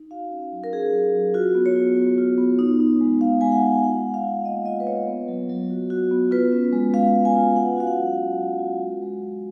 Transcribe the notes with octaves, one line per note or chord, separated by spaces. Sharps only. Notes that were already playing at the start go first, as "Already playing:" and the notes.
Already playing: D#4
F#4 F5
C#4
F#3
A#4
C#4 G#4
F#3
F#3
F4 F#4
B3
C#5
F4
B3
F4
B3
D#4
D#4
G#3
D#4 F5
G#3 G#5
F#5
G#3
F4 F#5
F4
F5
F4
A#3 D#5
F4 D#5
B4
F4 C#5
B3
F#3
F#3
F#4
F#4
B3
F4 B4
C#4
G#3
G#3 F5
G#3
G#5
F4
C#4 F#5
F#4 F5
F#5
F#3
F#3
F#3
F#4
G#3
G#3
G#3